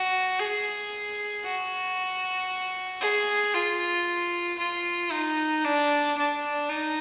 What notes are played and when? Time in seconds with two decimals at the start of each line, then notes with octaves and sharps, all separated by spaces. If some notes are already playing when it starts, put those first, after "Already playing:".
Already playing: F#4
0.40 G#4
1.44 F#4
3.01 G#4
3.54 F4
4.59 F4
5.12 D#4
5.64 D4
6.17 D4
6.69 D#4